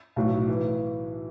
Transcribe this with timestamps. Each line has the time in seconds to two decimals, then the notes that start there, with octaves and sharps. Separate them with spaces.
0.16 B1 A2 F#3
0.49 E3